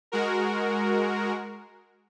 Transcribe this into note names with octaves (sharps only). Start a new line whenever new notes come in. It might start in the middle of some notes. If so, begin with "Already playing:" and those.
G#3 F#4 A#4